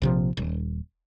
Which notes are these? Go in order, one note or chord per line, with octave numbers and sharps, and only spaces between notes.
A#1 C3 F3
D#1